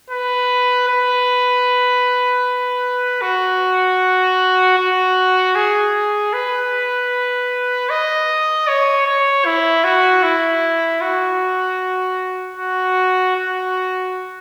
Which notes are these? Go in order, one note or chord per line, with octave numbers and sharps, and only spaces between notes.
B4
B4
F#4
F#4
G#4
B4
D#5
C#5
C#5
E4
F#4
E4
F#4
F#4
F#4